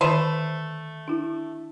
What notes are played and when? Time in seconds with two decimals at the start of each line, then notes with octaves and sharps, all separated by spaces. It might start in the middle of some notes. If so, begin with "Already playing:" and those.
0.01 D3 D#3 A3 B4 C5
1.08 D4 E4